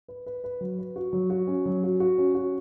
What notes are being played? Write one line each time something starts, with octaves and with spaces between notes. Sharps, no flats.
B4
B4
B4
F#3
B4
F#4
F#3
F#4
C#4
F#3
F#4
F#4
C#4
F#4